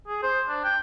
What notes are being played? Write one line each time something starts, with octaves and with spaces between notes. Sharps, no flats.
G#4
C5
D4
G5